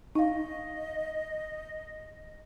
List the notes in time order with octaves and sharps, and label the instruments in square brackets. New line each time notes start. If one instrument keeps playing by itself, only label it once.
[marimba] D#4 F5 [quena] D#5